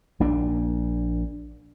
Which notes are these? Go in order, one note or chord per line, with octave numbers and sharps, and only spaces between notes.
A#1 A#2 D4